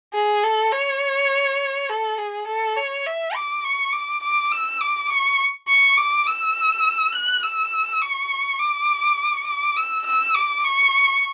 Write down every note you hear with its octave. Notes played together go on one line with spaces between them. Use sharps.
G#4
A4
C#5
A4
G#4
A4
C#5
E5
D6
C#6
D6
D6
E6
D6
C#6
C#6
D6
E6
F#6
E6
C#6
D6
D6
E6
E6
D6
C#6